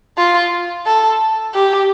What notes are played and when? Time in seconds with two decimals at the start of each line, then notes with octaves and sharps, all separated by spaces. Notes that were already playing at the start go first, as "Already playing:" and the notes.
0.18 F4
0.87 A4
1.55 G4